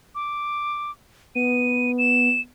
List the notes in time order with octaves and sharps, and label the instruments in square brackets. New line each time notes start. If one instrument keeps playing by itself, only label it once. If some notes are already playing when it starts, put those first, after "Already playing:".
[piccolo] D6
[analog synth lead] B3 [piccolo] D#7
[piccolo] E7